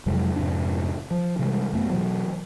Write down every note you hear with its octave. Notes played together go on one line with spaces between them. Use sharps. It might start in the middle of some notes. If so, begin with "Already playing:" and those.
F2 C3 F#3 G#3
F2 G#2 C3 D4
F3
C3 E3 G3 G#3
F#2 A3 B3
B2 E3 F#3